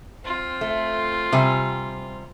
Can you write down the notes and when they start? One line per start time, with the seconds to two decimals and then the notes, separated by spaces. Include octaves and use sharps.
0.25 C4 F4
0.61 A3
1.32 C3 G3 G#5